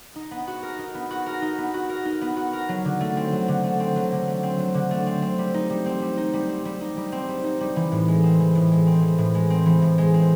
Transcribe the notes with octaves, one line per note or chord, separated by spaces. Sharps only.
D#4
B3
F#4
A#4
D#4
B3
F#4
A#4
D#4
B3
F#4
A#4
D#4
B3
F#4
A#4
F#3
D3
A3
C4
F#3
D3
A3
C4
F#3
D3
A3
C4
F#3
D3
A3
C4
C4
G3
D#4
G3
C4
G3
D#4
G3
C4
G3
D#4
G3
C4
G3
D#4
G3
E3
A2
G#3
C4
E3
A2
G#3
C4
E3
A2
G#3
C4
E3
A2
G#3
C4